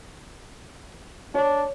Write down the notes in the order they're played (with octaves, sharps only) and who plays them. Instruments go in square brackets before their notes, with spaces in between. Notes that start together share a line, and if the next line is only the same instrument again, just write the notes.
[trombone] D4 [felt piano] C#5